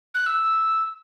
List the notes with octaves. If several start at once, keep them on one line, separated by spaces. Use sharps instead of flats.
F#6
E6